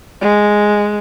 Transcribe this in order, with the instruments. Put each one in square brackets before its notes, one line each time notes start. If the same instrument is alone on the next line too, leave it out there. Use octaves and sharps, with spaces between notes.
[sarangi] G#3